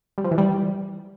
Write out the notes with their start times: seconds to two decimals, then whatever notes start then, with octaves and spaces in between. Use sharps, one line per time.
0.18 G3
0.24 F3
0.31 E3
0.38 G3